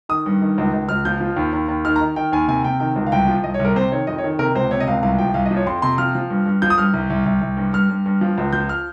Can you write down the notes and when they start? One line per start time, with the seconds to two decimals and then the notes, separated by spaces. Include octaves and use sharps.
0.09 D#3 D#6
0.26 G2
0.42 D#3
0.58 C#2
0.73 C#2
0.89 C#2 F6
1.05 F3 G6
1.21 F3
1.36 D#2
1.53 D#2
1.68 D#2
1.85 D#3 F6
1.96 A#5
2.01 D#3
2.16 D#3 G5
2.32 D#2 G#5
2.48 C3 G#5
2.65 C3 G5
2.80 D#3 G5
2.96 C#2
3.07 F5
3.12 C2 G5
3.28 F3
3.43 C2 D#5
3.54 C#5
3.59 C2
3.65 A#4
3.75 C3 C5
3.92 D#3 C#5
4.07 F2 D#5
4.18 C#5
4.24 D#3
4.39 C3 A#4
4.55 C#2 C5
4.71 C3 C#5
4.80 D#5
4.87 C#2 F5
5.03 C2 F5
5.19 F3 G5
5.34 C2 F5
5.46 D#5
5.51 F3
5.57 C#5
5.67 F2 C6
5.82 C3 C6
5.98 F3 F6
6.15 F3
6.30 G2
6.46 G2
6.62 F3 G6
6.70 D#6
6.78 G2 F6
6.93 C2
7.10 C2
7.26 C2
7.41 C2
7.57 G2
7.73 G2 F6
7.89 G2
8.06 G2
8.21 F3
8.38 C#2
8.53 F3 G6
8.69 F6